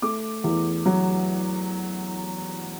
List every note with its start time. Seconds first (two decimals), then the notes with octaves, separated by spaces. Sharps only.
0.02 A3 D6
0.44 E2
0.86 F#3